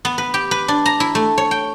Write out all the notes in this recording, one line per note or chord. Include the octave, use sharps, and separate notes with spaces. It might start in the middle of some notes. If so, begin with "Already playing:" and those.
B3
B4
G4
B4
D4
A#5
E4
A3
C#5
G5